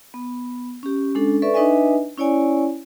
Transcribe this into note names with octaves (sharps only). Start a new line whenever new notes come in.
B3
C#4 G4
G#3 C#4 D4 A4
A4 B4 D5 E5 C#6
D4 D#4 B4 D#5 E5 G#5
C#4 E4 C#5 D5 G#5